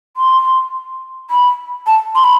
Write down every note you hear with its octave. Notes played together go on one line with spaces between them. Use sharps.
C6
B5
A5
C6
B5